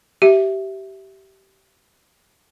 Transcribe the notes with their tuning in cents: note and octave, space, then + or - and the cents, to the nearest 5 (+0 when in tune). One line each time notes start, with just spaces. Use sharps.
G4 -20 E5 +0